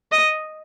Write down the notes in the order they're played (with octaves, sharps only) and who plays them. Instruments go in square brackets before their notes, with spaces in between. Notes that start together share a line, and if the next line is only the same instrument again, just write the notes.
[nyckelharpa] D#5